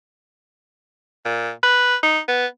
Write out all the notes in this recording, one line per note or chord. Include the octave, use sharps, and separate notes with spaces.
A#2
B4
D#4
B3